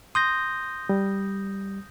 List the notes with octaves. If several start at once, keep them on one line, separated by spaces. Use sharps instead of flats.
C6 D#6 G6 A#6
G3